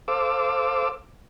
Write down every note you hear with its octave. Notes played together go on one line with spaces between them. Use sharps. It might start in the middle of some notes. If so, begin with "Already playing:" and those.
A4 C5 F5 D6 E6